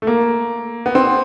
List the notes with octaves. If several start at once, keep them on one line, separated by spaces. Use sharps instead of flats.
A3
A#3
B3
C4